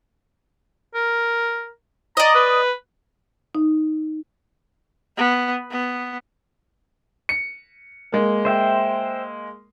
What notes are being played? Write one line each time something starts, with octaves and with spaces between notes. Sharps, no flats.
A#4
D5 D#5 A#5
B4
D#4
B3
B3
C#7
G#3 A#3
C5 E5 G5